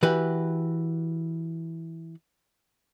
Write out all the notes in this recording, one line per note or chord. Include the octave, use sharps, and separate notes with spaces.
E3 F#4 G4 B4